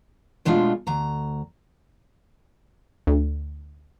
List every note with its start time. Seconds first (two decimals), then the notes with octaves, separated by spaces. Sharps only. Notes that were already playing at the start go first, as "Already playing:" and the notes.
0.45 B2 G#3 A3 D4 F4
0.87 D2 A#5
3.07 D2